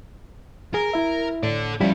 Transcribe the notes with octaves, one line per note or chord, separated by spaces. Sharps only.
G#4 A#4
E4 E5
A2 A4 D5
F3 G3 C#4 E4